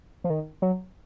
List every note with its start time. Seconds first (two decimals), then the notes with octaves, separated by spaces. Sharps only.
0.24 F3
0.30 D#3
0.62 F#3